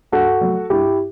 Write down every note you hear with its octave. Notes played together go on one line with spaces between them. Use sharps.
G2 F#4 A4
F#3 A3
G2 E4 G4